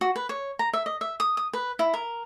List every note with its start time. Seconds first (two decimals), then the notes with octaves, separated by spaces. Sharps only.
0.01 F#4
0.16 B4
0.29 C#5
0.59 A#5
0.73 E5
0.86 D#5
1.01 E5
1.20 D#6
1.37 D#6
1.53 B4
1.79 E4
1.94 A#4